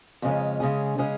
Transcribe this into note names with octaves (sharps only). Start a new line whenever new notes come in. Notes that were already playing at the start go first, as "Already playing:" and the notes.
F2 C#3 G#3 C#4
C#3 G#3 C#4 G#4
C#3 G#3 C#4 G#4